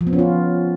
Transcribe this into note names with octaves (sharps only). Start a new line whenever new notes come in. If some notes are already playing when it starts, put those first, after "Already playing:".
F3
B3
C#4
F4